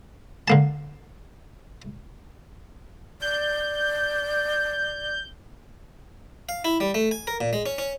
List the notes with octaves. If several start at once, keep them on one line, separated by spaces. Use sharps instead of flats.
D3 A#3 A5
D5 G6
F5
E4
G3
A3
G#5
A#4
A#2
G#3
C#4
C#4